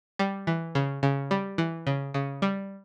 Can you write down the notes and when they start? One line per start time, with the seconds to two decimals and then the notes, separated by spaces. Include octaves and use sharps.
0.19 G3
0.47 E3
0.75 C#3
1.03 C#3
1.31 G3
1.58 E3
1.87 C#3
2.14 C#3
2.42 G3